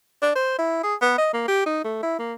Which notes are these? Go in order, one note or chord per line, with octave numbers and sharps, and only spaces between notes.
D4
C5
E4
G#4
B3
D#5
A#3
G4
D#4
A3
E4
A#3